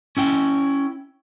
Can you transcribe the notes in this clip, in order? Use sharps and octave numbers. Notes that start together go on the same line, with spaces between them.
C#4 E4 G5